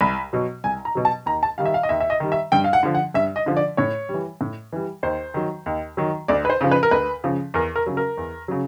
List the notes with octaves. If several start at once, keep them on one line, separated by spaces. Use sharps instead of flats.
C2 B5
B2 F#3
C2 G#5
A#5
B2 F#3
A5
D#2 A#5
A5
D#3 G3 F5
E5
F5
D#5
D#2 E5
E5
D#5
D#3 G3
E5
G2 G5
F5
F#5
D3 F3
F#5
G2 E5
D#5
D3 F3
D5
A2 C#5
G3
E3
A2
E3 G3
D#2 C5
D#3 F#3
D#2
D#3 F#3
D2 D5
B4
C5
C#3 F3
B4
A#4
D2 B4
C#3 F3
E2 A#4
A#4
C#3 F#3
A#4
E2
C#3 F#3